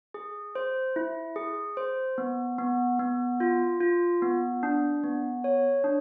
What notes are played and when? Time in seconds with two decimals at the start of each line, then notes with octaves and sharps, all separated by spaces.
0.14 G#4
0.55 C5
0.96 E4
1.36 G#4
1.77 C5
2.18 B3
2.59 B3
2.99 B3
3.40 F4
3.81 F4
4.22 B3
4.63 D4
5.04 B3
5.44 C#5
5.84 D4